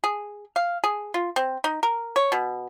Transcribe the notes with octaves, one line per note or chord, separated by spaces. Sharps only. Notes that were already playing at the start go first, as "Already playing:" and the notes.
G#4
F5
G#4
F4
C4
D#4
A#4
C#5
B2